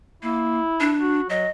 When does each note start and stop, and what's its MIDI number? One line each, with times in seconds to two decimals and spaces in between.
0.23 0.60 58
0.23 0.95 64
0.80 1.21 62
1.00 1.28 66
1.30 1.46 54
1.30 1.50 75